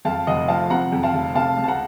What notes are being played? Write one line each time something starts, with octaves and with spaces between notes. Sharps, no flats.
F2 F5 A5
F1 D#5 F#5
F3 F5 A5
C3 F#5 A#5
F2
F5 A5
F1
C3 F5 A5
C#2
A5
F#5 A#5